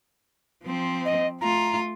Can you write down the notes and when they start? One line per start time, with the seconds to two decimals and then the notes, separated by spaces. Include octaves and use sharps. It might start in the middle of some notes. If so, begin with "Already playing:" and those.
0.65 F3 C4
1.05 D#5
1.41 A3 F4 A#5